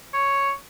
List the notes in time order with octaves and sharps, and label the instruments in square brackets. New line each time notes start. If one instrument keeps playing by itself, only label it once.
[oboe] C#5